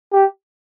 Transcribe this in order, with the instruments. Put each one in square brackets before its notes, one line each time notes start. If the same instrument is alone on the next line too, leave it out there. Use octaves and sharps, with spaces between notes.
[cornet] G4